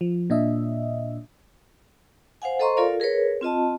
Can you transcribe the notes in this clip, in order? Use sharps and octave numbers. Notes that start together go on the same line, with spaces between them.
F3
A#2 D4 D#5 E5
C5 F5 F#5 G#5
A4 C5 D#5 A#5 C6 C#6
F4 A4 A#4 D5 F5
G#4 A#4 B4 C#5
C4 F4 D#5 A5